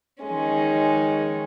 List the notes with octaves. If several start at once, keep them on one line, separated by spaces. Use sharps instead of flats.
D#3 G#3 C#4